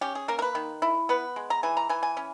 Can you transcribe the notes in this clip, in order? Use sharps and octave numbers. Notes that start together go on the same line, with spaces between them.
C#4 G4
G#4
A#3 A#4
A#4
B4
D#3
E4
B3 B4
G#3
A#5
E3 G#5
A#5
E3 G#5
G#5
C#4